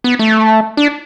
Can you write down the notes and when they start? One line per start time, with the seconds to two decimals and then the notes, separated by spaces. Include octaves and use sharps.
0.04 B3
0.19 A3
0.77 D4